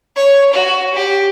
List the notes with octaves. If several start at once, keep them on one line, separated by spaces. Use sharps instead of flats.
C#5
F#4
G4